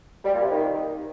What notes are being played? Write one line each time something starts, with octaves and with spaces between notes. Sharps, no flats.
G3
A#2
C3
D#3